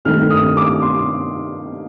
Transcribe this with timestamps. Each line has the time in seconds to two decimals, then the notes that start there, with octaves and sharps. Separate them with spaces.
0.05 G2 D#3 A3 C4 F6
0.30 D#6
0.57 D6
0.82 C6